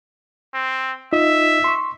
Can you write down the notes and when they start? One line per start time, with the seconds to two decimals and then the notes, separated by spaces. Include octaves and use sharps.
0.54 C4
1.13 D#4 F4 D#5 E5
1.64 C6 C#6